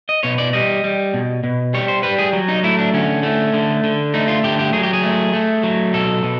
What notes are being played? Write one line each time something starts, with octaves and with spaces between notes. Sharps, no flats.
D#5
B2 C#5
D5
G3 D#5
G3
B2
B2
G3 C#5
C5
G3 B4
G#4
F#3
D#4
A3 E4
D4
D3 C#4
A3
D3
D3
A3 D#4
F4
D3 G4
G4
F#3 G#4
G4
G#4
A3
A3
F#3
B2 A4
B2